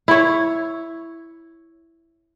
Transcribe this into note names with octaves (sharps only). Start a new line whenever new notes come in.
E4 C#5